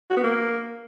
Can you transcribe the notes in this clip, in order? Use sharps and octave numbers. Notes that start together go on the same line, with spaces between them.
F#4
B3
A#3